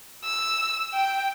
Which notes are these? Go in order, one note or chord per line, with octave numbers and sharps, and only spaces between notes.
E6
G5